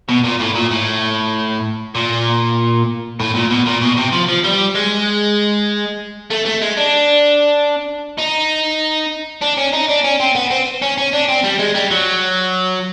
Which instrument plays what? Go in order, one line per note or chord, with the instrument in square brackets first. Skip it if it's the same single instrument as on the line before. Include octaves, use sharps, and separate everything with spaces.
[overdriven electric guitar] B2
A#2
A2
A#2
A2
A#2
A2
A#2
B2
A#2
B2
C3
F3
F3
G3
G#3
A3
A3
G#3
D4
D#4
D4
C#4
D#4
D4
C#4
C4
B3
C4
C#4
C#4
D4
C4
G3
G#3
G3
F#3